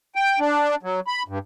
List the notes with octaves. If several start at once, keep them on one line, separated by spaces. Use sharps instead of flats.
G5
D4
F#3
B5
G2